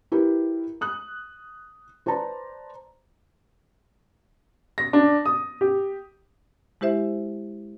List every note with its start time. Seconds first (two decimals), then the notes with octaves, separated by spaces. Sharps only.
0.12 E4 G4 A#4 B4
0.81 D#6 F#6
2.06 B4 C5 D5 A5 A#5
4.78 A#6
4.93 D4
5.26 D#6
5.61 G4
6.81 G#3 E4 G4 C5 E5